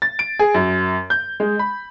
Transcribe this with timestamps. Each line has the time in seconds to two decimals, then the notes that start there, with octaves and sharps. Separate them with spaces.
0.02 A6
0.19 D7
0.39 G#4
0.54 F#2
1.10 G6
1.40 G#3
1.59 B5